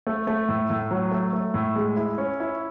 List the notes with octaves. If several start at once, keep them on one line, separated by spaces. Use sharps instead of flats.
A3
A3
A2
A2
F#3
A3
A3
A2
G#3
E4
C#4
E4